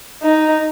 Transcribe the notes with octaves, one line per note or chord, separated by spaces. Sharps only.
D#4